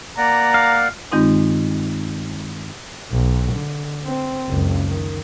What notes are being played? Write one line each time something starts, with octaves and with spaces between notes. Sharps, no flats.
A#3 D5 F#5 A#5
F5
G2 D#3 G#3 C4 D#4 F4
B1
D3
C4
F#1 C#2
D#3